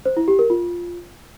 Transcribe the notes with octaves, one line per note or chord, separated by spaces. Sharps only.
C5
E4
G4
A#4
F4